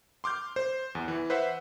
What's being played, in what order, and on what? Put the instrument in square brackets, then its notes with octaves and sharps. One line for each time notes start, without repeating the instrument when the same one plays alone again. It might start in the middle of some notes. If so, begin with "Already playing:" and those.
[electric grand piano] C6 D6 F6 G6
C5
E2
E3
B4 C5 E5 F#5